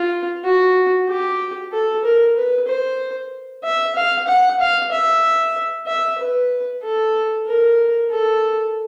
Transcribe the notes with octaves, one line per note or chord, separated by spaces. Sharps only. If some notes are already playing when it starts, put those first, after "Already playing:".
Already playing: F4
F#4
G4
A4
A#4
B4
C5
E5
F5
F#5
F5
E5
E5
B4
A4
A#4
A4